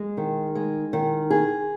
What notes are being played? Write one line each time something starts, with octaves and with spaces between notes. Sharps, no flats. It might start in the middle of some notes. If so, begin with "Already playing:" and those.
Already playing: G#3
D#3
G#3
D#3
G#4